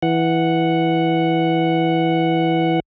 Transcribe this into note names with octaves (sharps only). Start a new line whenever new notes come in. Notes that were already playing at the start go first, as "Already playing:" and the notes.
E3 F#5